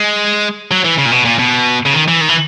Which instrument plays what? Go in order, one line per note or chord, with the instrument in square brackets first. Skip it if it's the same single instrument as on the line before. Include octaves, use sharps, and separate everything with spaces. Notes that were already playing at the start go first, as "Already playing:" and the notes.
Already playing: [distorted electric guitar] G#3
F#3
E3
C#3
A#2
B2
A#2
B2
C#3
D#3
E3
D#3
E3